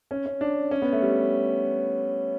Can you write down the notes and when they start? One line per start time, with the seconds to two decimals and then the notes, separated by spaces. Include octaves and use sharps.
0.11 C#4
0.26 C#4
0.41 D4
0.71 C#4
0.82 B3
0.92 A3
1.02 G3